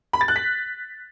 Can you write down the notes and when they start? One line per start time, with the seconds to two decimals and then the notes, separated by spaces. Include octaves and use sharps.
0.13 B5
0.21 A6
0.28 F#6
0.36 B6